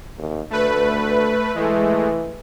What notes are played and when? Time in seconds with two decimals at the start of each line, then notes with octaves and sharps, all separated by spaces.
0.18 D#2
0.51 D2 A3 B4
1.56 E3 G#3 A3